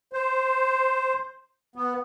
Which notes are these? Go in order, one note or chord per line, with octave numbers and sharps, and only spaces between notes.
C5
B3